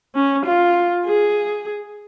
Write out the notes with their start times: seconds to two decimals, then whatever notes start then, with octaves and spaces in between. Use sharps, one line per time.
0.15 C#4
0.46 F4
1.06 G#4